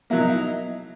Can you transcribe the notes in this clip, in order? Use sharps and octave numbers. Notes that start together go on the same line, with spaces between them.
B2 F#3 A#3 E4
D#4
E4